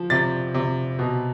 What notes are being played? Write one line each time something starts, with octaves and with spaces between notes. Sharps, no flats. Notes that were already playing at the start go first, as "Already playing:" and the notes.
Already playing: F3
C3 A6
C3
B2